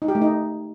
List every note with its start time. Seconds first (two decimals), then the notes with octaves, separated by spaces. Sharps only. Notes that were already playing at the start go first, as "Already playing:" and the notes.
0.02 D#4
0.08 G4
0.15 A3
0.22 D#4